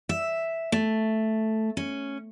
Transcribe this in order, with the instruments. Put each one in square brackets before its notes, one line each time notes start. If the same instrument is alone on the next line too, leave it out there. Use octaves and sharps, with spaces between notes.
[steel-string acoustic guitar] E5
A3
C#4